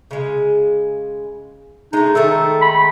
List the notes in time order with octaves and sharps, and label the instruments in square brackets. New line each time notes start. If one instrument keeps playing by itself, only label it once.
[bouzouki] C#3 G#3
[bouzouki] G#3 A3 [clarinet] D#4
[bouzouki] D#3 G#3 A3 [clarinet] A4
[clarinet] B5